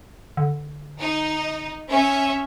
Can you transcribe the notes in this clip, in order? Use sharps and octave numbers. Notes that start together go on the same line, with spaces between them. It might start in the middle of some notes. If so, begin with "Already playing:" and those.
D3
D#4
C#4 E5